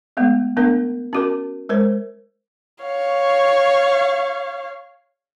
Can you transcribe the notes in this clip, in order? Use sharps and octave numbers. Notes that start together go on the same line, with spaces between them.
G#3 A3 B3
A3 B3 D4 A#4
C#4 F#4 A#4
G#3 A#4 C5 C#5
C#5 F5